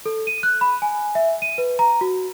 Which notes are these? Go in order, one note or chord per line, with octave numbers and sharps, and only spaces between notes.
A4
D#7
F#6
B5
G#5
E5
D#7
B4
A#5
F#4